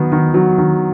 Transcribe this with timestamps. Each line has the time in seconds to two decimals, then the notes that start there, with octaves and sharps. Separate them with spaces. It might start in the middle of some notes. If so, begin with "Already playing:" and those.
Already playing: D#3 F#3 B3
0.12 D#3
0.34 F#3
0.58 D#3